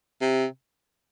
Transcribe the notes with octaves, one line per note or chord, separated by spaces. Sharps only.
C3